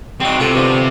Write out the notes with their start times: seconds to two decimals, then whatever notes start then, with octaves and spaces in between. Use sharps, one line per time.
0.20 G3 C4 D#4 F#4
0.40 C3 F4 A4
0.54 B2 D3 F3